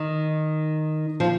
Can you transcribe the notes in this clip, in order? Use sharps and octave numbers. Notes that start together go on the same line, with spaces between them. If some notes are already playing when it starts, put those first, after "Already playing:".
Already playing: D#3
F3